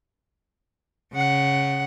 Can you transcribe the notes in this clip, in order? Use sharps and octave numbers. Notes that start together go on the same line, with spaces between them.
C#3 F#5